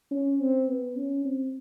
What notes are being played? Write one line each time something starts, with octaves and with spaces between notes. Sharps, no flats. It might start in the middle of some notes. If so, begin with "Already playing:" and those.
C#4
C4
B3
C#4
C4